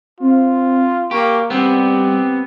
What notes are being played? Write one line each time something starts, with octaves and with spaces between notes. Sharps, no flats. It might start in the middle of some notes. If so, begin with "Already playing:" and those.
C4 F4
A#3 G4 C#6
G3 B3 C4 G4